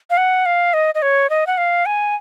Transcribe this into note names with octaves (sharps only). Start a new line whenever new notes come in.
F5
F#5
F5
D#5
D#5
C#5
D#5
F#5
F5
G#5